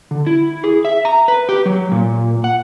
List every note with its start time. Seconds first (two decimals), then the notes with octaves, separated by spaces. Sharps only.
0.11 D3
0.27 E4
0.64 G#4
0.85 E5
1.05 A#5
1.28 B4
1.49 G4
1.66 F#3
1.92 A#2
2.44 F#5